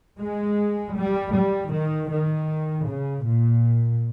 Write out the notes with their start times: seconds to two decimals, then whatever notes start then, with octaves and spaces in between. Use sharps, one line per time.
0.20 G#3
0.97 G3
1.35 G3
1.74 D#3
2.12 D#3
2.88 C#3
3.27 A#2